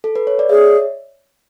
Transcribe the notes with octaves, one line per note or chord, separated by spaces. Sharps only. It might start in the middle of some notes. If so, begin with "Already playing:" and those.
A4
B4
C#5
D5
G#4 C#5 E5